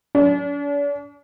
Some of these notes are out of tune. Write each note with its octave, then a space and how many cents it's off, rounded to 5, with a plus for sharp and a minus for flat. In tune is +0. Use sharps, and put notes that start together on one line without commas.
D4 -45